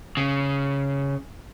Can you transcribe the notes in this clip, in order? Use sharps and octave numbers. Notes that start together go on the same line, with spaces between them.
C#3